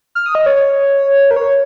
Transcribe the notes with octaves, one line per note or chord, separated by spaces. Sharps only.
F6
D#6
D#5
C#5
C#5
A#4
C#5